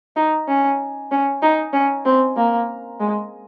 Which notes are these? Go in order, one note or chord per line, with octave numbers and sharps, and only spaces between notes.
D#4
C#4
C#4
D#4
C#4
C4
A#3
G#3